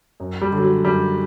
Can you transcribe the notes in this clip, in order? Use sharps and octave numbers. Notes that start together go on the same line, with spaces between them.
F#2
G3
D3 F#3
F#3
F#2 G3